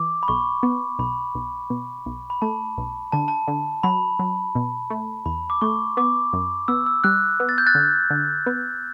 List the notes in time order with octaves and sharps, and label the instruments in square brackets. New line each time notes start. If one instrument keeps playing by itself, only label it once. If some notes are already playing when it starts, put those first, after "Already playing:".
Already playing: [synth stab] E3 [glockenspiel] D6
[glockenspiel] B5
[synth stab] B1 [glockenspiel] C#6
[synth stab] B3
[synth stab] B1 [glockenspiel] B5
[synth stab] B1
B2
B1
[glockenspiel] B5
[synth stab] A3 [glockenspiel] A5
[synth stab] B1
[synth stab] D3 [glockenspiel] A5
[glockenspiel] A5
[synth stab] D3
[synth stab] F#3 [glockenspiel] B5
[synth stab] F#3
B2
A3
[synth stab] E2 [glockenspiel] B5
[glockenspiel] D6
[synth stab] A3 [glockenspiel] C#6
[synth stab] B3 [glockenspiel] D6
[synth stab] F#2
[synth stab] B3 [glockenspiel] E6
[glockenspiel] E6
[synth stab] G3 [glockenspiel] F#6
[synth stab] B3
[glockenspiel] A6
G6
F#6 A6
[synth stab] D3
D3
B3